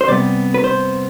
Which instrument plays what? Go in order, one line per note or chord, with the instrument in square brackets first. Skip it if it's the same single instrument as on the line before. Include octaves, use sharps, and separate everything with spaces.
[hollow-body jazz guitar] C5
C3 G3 B3 D5
B4
C5